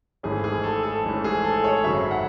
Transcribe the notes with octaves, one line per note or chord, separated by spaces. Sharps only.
G#1 G#2 E3 A3 C#4 G#4
G#4
A4
A4
G#1 G#2 E3 A3 C#4 A4
G#4
A4
C#5
G#1 F#2 C#3 F#3 E5
F#5